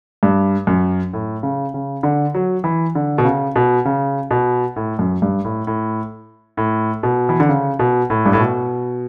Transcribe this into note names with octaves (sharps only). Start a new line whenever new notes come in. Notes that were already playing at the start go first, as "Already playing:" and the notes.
G2
F#2
A2
C#3
C#3
D3
F#3
E3
D3
B2
C#3
B2
C#3
B2
A2
F#2
G2
A2
A2
A2
B2
E3
D3
C#3
B2
A2
G2
A2
B2